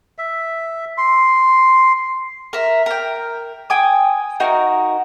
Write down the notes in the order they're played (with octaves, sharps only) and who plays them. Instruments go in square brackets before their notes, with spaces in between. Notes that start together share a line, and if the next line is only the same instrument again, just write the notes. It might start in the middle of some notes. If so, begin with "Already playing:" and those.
[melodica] E5
C6
[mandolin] A#4 E5
A#4 G5
G5 G#5 D#6
D#4 F#4 A#4